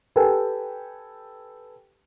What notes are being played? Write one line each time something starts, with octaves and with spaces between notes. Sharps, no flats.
G4 A4 B4 G5 G#5